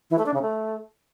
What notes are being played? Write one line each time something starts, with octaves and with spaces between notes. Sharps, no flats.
E3
A3
D4
C#3
A3